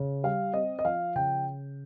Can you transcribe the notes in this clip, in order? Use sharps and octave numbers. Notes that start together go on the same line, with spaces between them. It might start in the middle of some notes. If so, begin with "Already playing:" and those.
Already playing: C#3
G3 F5
C4 D#5
D#5
F3 F5
C#3 G5